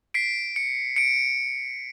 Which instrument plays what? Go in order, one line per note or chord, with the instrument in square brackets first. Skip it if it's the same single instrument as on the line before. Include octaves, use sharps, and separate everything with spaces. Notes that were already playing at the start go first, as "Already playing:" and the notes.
[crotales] B6 C7 D7
C#7
C#7 D7